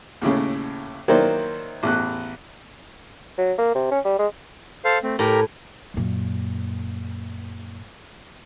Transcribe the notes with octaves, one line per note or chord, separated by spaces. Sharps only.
D#2 A2 C#3
D#3 F#3 A#3 E4 C5 D5
A1 E2 F#6
F#3
A#3
C3
C#4
G3
G#3
A4 C5 F5
A3 C4
A2 G4 A#4 A#5
F#2 A#2